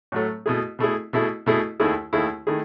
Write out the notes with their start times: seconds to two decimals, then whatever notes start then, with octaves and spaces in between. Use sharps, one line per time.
0.12 A2 F#3 A3
0.46 B2 A3 E4 G#4
0.79 B2 A3 E4 G#4
1.13 B2 A3 E4 G#4
1.46 B2 A3 E4 G#4
1.80 D#2 D#3 A3 E4 G#4
2.13 D#2 D#3 A3 E4 G#4
2.47 D#3 A3 E4 G#4